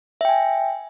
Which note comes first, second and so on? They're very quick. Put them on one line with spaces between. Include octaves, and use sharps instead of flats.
E5 G5 G#5